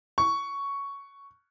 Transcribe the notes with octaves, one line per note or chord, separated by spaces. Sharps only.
C#6